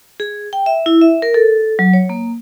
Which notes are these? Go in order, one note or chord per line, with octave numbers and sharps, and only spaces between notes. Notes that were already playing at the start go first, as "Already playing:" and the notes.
G#4
G5
E5
E4
E5
A#4
A4
F#3
C#5
A#3